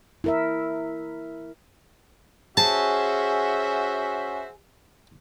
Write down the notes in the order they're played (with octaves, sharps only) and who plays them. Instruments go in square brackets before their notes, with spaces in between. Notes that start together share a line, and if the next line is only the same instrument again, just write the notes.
[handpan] E4 A#4 E5
[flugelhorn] C#4 [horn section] F#4 C5 E5 [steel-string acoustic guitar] G#4 [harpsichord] A5